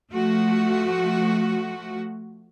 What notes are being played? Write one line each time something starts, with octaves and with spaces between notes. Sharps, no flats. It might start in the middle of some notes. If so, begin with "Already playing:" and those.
F3 A3 F#4